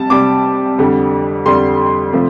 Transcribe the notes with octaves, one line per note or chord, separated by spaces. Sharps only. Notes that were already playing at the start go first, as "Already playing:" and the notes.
Already playing: C3 G3 A5
C3 G3 D6
F2 D3 G3
F2 D3 G3 C6
C3 F3 A3